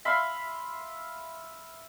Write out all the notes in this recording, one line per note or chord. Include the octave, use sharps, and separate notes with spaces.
E5 F5 B5 C6